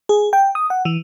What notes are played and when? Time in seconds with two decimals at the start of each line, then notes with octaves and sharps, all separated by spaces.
0.09 G#4
0.33 G5
0.55 D#6
0.70 F#5
0.85 E3